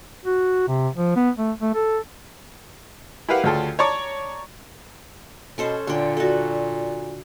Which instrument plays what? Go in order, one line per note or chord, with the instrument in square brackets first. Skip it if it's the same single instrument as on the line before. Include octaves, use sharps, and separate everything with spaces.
[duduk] F#4
C3
F3
B3
A3
A3
A4
[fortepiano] E4 G4 A#4 B4 F5 F#5
D2 C#3 F4 A4 G5 A5
C#5 D5 A5 A#5 C#6 D6
[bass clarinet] B2 [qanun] C#4 A4 C5
[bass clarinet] A#2 [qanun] D3 G5
[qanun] F#4 A4